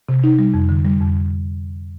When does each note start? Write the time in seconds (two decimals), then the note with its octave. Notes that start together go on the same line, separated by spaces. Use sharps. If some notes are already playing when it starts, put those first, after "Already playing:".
0.09 C3
0.24 D#4
0.39 G3
0.54 F2
0.69 D3
0.85 G3
1.00 F2